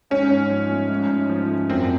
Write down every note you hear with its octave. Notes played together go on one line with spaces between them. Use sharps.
G#2 C#4
G#2
F3
A3
G#2
G#2
F3
A3
F#2 C4